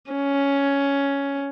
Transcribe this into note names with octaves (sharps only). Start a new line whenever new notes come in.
C#4